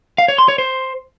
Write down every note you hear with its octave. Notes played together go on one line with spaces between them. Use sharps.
F5
C#5
C6
C#5
C5